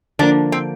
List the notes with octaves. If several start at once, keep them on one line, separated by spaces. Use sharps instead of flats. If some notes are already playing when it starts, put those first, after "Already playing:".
D3 F3 A#3 D4
C4